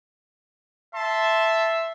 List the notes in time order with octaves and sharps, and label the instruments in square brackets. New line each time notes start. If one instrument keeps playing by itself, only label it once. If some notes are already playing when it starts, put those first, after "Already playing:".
[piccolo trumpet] E5 [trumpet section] A5 C6